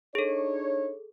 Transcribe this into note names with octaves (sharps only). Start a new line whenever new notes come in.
D4 D#4 G#4 A4 C#5